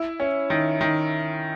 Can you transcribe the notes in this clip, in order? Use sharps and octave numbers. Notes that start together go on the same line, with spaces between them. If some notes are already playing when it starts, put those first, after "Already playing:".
Already playing: E4
C#4
D#3
D#3